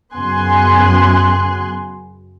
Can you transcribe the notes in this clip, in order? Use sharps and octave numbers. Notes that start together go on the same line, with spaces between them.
F#2 C#3 B3 G#5 C6 F#6